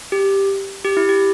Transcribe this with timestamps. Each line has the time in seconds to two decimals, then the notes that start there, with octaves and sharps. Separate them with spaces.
0.12 G4
0.85 G4
0.97 E4
1.09 G4